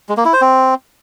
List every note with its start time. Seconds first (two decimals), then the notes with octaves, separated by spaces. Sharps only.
0.09 G#3
0.17 A#3
0.25 E4
0.33 C5
0.41 C4